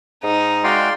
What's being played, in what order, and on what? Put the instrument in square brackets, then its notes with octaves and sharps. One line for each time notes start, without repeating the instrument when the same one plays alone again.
[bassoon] G#2 [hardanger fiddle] D#4
[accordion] G#3 F#4 G5 [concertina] D5 F5 C6